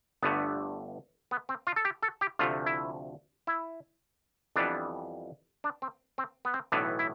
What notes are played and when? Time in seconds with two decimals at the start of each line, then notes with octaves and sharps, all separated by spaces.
0.22 G1 G2 D3 A3 B3
1.31 B3
1.49 C4
1.67 F4
1.76 A4
1.85 G4
2.03 A4
2.21 G4
2.39 D2 C3 F3 A3 F4
2.66 E4
3.47 E4
4.56 F2 E3 G3 B3 D4
5.64 D4
5.82 C4
6.18 C4
6.45 B3
6.54 C4
6.72 B1 A2 E3 B3 D4
6.99 E4